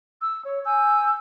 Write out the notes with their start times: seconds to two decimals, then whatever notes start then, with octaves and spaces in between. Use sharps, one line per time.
0.20 E6
0.44 C#5
0.64 G#5 E6 G6